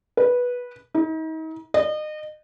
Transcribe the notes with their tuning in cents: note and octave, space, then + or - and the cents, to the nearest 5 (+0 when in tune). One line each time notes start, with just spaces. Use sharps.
B4 -10
D#4 +40
D#5 -30